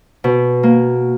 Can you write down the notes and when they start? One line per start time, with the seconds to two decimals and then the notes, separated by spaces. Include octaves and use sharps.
0.24 B2
0.63 A#3